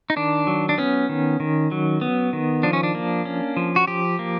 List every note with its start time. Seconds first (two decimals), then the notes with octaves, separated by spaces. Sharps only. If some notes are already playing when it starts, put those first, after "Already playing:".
0.10 D#4
0.16 D#3 D4
0.47 F#3
0.69 D4
0.78 B3 C#4
1.09 D#3
1.40 D#3
1.71 F#3
2.01 B3
2.33 D#3
2.63 F3 D4
2.73 C#4
2.83 D4
2.95 A#3
3.25 C#4
3.57 F3
3.76 F#4
3.87 F3 G4
4.19 A#3